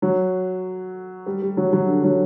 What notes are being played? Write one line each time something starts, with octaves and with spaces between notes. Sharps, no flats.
F#3
G3
G3
F#3
F#3
D3
F#3